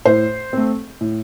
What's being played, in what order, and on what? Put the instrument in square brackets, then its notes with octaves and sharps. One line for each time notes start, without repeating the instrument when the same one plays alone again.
[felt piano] A2 C5
A3 C4
A2